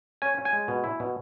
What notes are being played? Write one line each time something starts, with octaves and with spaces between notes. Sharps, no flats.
C#4 G#5
C#4
G#5
G#3
B2
E4
B2